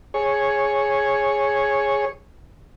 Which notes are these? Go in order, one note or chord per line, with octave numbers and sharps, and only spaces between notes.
G#4 C#5